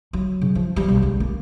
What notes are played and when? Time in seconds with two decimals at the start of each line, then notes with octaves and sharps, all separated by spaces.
0.13 F#3
0.41 C#3
0.55 F3
0.76 G3
0.89 B1
1.03 C#2
1.20 A#3